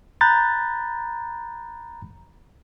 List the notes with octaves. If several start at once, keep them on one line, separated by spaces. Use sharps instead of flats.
A#5 B5 F#6 G6 A6